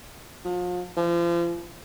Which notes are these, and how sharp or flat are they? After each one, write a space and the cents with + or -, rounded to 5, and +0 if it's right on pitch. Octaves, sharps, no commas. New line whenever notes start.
F3 +35
F3 -35